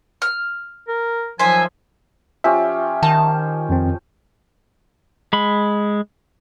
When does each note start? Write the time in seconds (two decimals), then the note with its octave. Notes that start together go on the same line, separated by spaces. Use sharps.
0.22 F6
0.88 A#4
1.39 D#3 F3 F#3 C5 E5 G#5
2.44 F3 C#4 G4 E5
3.03 D#3 A5
3.69 F2 C4
5.33 G#3 B5